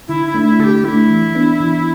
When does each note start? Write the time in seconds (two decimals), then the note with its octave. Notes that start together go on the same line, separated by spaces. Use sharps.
0.08 D3 E4
0.26 E4
0.34 A3 D4
0.42 E4
0.59 D3 A4
0.64 G4
0.84 A3 D4 E4
1.10 E3
1.35 B3 D4
1.60 E3